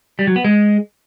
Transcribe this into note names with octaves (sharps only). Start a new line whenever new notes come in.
G3
F#3
B3
G#3